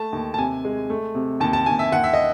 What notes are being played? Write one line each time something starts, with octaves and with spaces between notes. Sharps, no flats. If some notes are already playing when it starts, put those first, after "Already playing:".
Already playing: A3 A5
D#2
A5
C3 G#5
G#3
A3
C3
D#2 A5
A5
D#2 G#5
E5
D#2 F#5
E5
D#5